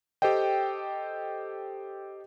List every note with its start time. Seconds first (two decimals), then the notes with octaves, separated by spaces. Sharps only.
0.22 G4 A4 C5 D#5 G5